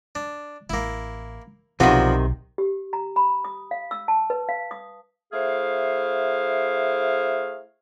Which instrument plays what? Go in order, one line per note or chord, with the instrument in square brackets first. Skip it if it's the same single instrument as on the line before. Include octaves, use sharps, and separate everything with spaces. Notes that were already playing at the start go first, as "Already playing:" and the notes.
[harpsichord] D4
[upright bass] A1 [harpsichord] A#3 E4
[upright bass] B1 [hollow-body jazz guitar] C3 D#3 [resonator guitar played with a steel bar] F3 [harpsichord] B3 D4 F#4
[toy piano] G4
A#5
B5
D#6
F5
E6
A5
B4
F5
D#6
[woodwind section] A3 E4 G#4 C5 F5